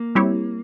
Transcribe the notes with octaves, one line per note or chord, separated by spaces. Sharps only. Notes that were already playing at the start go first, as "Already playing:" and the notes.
Already playing: A#3
G3 C4 E4 G4 C#5